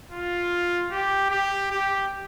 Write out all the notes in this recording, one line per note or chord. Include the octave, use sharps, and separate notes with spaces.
F4
G4
G4
G4